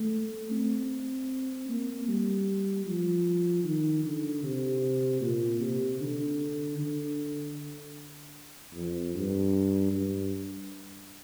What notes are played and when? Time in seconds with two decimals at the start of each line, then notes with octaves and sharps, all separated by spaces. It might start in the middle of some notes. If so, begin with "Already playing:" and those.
Already playing: A3
0.51 C4
1.69 A#3
2.08 G3
2.86 F3
3.64 D#3
4.04 D3
4.43 C3
5.21 A#2
5.60 C3
6.00 D3
6.79 D3
8.74 F2
9.14 G2
9.92 G2